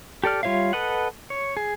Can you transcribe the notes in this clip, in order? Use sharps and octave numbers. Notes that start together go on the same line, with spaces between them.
G4 A4 D5 F6
G3 F4 C#5 E5 F5
A4 B4 D#5 F#5
C#5
G#4